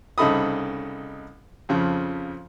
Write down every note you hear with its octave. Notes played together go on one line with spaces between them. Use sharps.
C2 C#3 D#4 A4 B5 D#6
F2 C#3 F3